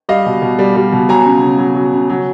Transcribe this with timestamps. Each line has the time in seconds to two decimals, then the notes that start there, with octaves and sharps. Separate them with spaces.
0.09 G3 D#5 F5
0.26 B2
0.42 B2
0.59 G3
0.76 G3
0.92 B2
1.09 F#3 G#5 A#5
1.26 C#3
1.43 C#3
1.59 F#3
1.75 F#3
1.93 C#3
2.09 F#3